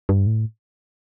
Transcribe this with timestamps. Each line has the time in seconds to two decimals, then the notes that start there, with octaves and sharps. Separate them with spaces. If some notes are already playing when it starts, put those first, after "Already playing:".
0.09 G2
0.27 A2